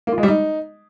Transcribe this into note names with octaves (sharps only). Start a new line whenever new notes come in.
A#3
F4
G#3
G3
D#4